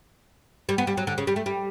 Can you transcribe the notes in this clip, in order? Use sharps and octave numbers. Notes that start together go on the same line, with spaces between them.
G3
B3
G3
F#3
D3
C#3
G3
A3
G3